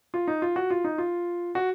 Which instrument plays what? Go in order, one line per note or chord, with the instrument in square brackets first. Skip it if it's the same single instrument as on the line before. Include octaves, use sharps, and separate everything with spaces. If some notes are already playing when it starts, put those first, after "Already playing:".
[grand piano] F4
D#4
F4
F#4
F4
D#4
F4
F#4